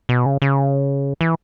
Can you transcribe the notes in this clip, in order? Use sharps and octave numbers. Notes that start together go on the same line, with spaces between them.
B2
C#3
C#3
E3